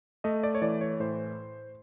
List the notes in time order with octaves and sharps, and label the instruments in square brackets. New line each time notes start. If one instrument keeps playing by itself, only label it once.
[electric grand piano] A3 D#5
D5
C#5
E3 D5
C#5
A2 C5